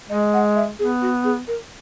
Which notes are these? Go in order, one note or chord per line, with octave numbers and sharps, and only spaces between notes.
G#3 D#5
F#5
E5
B3 G#4
F#4
G#4
A#4